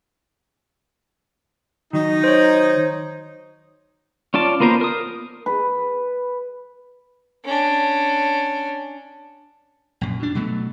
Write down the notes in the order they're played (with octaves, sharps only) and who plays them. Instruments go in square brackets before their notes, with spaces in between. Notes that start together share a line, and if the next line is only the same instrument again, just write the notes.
[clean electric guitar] D#3 F#3 [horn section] D#4
[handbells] C5 C#5
[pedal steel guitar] C#4 F4 D5 A5
A#3 B3 F4 A#4 C5
A#4 D#6
[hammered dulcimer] B4
[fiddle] C#4 D4
[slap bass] A#1 F#2
B2 D4
B2 F#3 A3